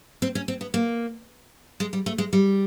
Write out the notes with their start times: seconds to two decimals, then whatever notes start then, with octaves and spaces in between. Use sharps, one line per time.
0.22 C4
0.35 C#4
0.48 C4
0.61 B3
0.74 A#3
1.80 G#3
1.93 G3
2.06 A3
2.18 G#3
2.33 G3